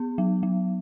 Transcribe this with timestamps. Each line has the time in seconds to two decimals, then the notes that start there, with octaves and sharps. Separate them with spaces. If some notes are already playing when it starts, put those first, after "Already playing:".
Already playing: B3
0.18 F#3
0.43 F#3